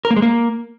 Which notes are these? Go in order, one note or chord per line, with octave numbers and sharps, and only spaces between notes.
A#4
A#3
G#3
A#3